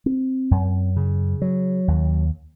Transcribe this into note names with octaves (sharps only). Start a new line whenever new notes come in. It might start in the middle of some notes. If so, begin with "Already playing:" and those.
C4
F#2
C#3
F#3
D#2